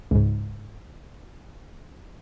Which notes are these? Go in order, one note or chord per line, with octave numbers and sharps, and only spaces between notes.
C#2 G#2